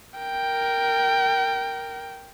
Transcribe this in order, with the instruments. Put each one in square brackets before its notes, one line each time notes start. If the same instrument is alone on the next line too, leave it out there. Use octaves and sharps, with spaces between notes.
[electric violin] A#4 G5